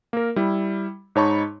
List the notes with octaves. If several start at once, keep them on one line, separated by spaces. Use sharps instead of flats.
A#3 A#4
G3 E4
G#2 D#4 C#5 A5 B5 C#6